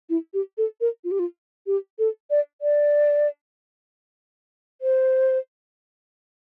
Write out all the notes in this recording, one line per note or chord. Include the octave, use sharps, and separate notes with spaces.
E4
G4
A4
A#4
F4
G4
F4
G4
A4
D5
D5
C5